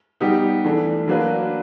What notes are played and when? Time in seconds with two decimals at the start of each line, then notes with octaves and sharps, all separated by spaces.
0.20 G3 B3 D#4 G4
0.64 E3 A3 D4
1.08 F#3 A#3 D4 F#4 B4